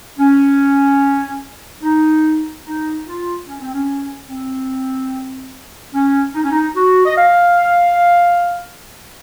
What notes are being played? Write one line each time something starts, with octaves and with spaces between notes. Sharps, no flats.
C#4
D#4
D#4
F4
C#4
C4
C#4
C4
C#4
D#4
C#4
D#4
F#4
D#5
F5